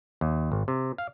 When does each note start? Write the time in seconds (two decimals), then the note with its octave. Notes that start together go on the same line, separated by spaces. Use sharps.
0.21 D#2
0.52 G#1
0.68 C3
0.98 F5